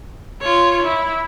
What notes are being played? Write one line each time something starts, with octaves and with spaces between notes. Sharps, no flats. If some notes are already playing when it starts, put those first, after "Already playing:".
F4 C#5
E4